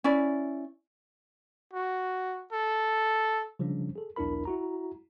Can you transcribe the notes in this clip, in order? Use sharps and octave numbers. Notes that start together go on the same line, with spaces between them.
C#4 E4 D5
F#4
A4
C#3 F3 G3 C#4 D4
G#4 A4
B1 E2 D4 E4 A#4 B5
E4 F#4 A#5